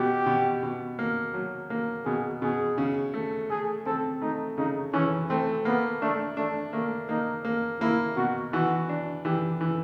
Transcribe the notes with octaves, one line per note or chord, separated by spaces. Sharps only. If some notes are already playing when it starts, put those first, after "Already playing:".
Already playing: B2 G4
B2
B2
A#3
F#3
A#3
B2 G#4
B2 G#4
C#3
A3
A3 G#4
C4 A4
A3 D#4
C#3 D#4
E3 C#4
A3 C4
A#3 B3
A3 D4
A3 D4
A3 A#3
A#3 D#4
A#3
A#3 E4
B2 F#4
E3 F#4
D4
E3 G4
E3